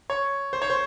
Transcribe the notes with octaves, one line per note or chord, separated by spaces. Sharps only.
C#5
C5
C#5
C5